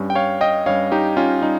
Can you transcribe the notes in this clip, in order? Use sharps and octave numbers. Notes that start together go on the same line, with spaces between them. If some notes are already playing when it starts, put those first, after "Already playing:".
Already playing: G2 G3 C#4
G5
C#5 F5
D#5 G5
G2 G3 C#4 C#5 F5
D#4 G4
C#4 F4
G3 D#4